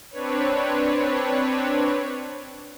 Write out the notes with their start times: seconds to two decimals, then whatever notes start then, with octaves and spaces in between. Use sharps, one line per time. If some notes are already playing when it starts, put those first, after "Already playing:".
0.11 C4 D4 B4 C#5